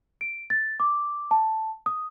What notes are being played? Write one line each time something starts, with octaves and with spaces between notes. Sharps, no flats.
D7
A6
D6
A5
D#6